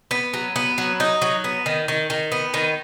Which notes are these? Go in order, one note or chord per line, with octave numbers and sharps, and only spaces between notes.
B3
F#3
B3
F#3
D#4
F#3
B3
D#3
D#3
D#3
B3
D#3